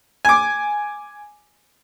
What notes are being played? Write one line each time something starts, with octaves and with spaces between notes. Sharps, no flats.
G#5 D6